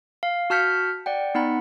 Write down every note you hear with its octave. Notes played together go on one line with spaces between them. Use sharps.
F5
F#4 A5 F6 G6 B6 C#7
D5 F#5 G5
B3 D#4 F#5 B5